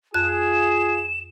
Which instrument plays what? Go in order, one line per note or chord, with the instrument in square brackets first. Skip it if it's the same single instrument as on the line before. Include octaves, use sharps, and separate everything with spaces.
[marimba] F2 F#6 [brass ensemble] F4 G#4 [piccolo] E7